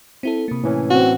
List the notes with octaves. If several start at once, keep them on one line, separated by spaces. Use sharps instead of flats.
C4 E4 A4
C3 A#3
A2 E3 C#4
C4 F#4